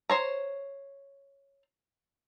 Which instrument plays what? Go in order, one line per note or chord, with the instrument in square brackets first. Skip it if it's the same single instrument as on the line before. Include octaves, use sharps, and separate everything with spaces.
[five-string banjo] C5 C#5 A#5